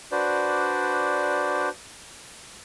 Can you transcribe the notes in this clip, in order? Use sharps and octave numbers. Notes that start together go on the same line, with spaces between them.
D4 F#4 B4 C5 D5